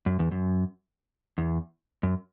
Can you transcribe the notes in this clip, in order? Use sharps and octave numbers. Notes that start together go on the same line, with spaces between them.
F#2
E2
F#2
E2
F#2